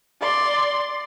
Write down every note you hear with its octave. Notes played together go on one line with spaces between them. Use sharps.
D5 C6